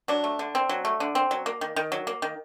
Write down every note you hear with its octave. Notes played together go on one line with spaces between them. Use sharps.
F#3 D4
A3
D3
C4
F#3
A3
D3
C4
F#3
A#3
D#3
D#3
F#3
A#3
D#3